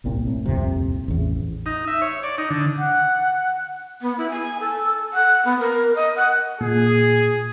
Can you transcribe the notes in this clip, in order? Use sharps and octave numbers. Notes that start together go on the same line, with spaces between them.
G1 C2 A#2 C4
A2
D#1 C2 F2 C3
A1 E2
D#4
E5
C#5
D5
D#4
D3
F#5
B3
E4
G#5
A4
F#5
B3
A#4
D#5
F#5
A#2 G#4